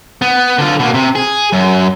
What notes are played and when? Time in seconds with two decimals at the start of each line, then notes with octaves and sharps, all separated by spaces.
0.22 B3
0.58 D3 F4
0.80 B2 A#3
0.94 C3
1.15 G#4
1.53 F#2